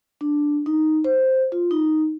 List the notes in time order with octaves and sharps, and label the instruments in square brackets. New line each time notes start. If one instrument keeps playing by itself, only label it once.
[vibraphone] D4
D#4
C5
F4
D#4